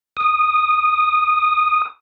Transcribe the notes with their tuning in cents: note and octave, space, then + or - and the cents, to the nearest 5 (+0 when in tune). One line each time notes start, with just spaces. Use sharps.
D#6 -10